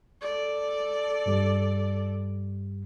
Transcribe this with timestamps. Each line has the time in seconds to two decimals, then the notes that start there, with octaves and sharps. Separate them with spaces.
0.21 A4 D5
1.26 G2 G3